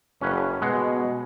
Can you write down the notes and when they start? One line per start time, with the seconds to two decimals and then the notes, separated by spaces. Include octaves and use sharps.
0.21 F#1 C#4 B4
0.62 B2 G#3 F#5